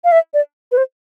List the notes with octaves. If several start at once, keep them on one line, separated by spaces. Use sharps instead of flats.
F5
E5
D5
B4
C5